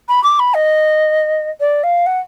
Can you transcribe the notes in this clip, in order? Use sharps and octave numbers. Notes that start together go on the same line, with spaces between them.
B5
D6
B5
D#5
D5
F5
F#5